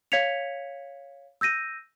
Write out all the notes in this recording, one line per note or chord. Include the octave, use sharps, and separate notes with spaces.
C#5 F5 G#6 B6 C#7 F7
E6 G6 A#6 D#7